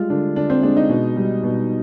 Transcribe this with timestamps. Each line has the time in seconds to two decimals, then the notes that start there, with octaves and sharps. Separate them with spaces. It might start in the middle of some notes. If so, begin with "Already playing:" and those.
Already playing: G3 G#3 F4
0.10 D3 D4
0.36 D3 D4
0.50 C4
0.63 G#3 D4
0.77 D#4
0.89 B2
1.16 G3
1.43 B2